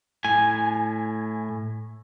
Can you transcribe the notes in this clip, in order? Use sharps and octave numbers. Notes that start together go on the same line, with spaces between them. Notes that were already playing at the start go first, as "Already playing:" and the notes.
A2 G#5